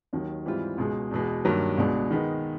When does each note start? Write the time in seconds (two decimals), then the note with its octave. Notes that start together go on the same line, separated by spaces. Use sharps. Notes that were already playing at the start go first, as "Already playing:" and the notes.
0.13 D#2 D#3 F#3
0.46 G#2 E3 G3 C4 F4
0.78 C#2 B2 G#3
1.11 E2 B2 G#3
1.45 G2 D#3 F#3 A#3
1.78 C#2 B2 G#3 B3 D4
2.11 D#3 G#3 B3 D#4